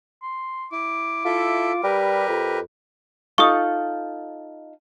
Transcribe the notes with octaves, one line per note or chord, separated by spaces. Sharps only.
C6
E4 D6
E4 F4 A4 E5
G3 G4 A#4 B4
F2
D#4 F4 A4 C#6 D#6